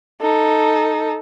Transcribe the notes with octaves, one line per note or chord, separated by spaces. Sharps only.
D#4 A4